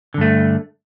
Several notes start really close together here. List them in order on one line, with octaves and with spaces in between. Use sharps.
D3 G2 A3